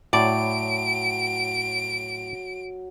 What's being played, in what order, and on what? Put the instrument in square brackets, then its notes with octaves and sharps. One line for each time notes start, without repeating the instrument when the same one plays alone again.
[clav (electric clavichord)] A2 [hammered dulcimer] F#3 [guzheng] D5 [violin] D7